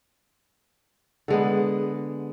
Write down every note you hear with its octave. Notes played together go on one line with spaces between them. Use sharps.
D3 G#3 B3